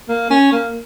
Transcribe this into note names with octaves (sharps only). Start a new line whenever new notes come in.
A#3
C#4
A#3